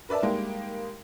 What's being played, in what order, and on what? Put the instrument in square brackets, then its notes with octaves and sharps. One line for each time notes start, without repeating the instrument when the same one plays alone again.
[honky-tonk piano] A#4 B4 D5 E5 A5
G3 G#3 A#3 D#4 G4